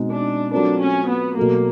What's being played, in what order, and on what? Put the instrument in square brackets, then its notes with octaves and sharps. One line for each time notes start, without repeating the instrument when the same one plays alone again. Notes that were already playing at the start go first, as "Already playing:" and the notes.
Already playing: [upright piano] B2 G#3 C4 D#4
[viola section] D4
[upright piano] F#3 A3 C4 F4 A#4 [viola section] D4
[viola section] C#4
B3
[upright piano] B2 F#3 A3 [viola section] A#3